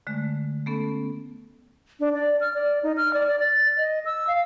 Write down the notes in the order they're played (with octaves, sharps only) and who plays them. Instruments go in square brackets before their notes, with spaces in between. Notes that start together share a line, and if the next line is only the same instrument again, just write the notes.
[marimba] D3 G#3 A3
A3 B3 C#4 A4
[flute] D4
D5
F6
D5
D#4
F6
D5
D5
A6
D#5
E6
F5